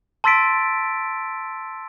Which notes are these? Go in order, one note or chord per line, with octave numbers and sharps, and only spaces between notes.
A5 C6 E6 A6 B6 D7